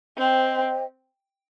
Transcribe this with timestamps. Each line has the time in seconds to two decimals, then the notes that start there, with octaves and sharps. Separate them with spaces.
0.17 C4 C5 D#5 G5